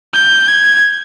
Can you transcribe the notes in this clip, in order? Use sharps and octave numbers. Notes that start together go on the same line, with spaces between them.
G6
G#6